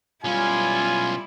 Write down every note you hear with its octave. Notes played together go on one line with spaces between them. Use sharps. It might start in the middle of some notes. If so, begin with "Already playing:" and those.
B1 G3 C#4 E4 F4 G#5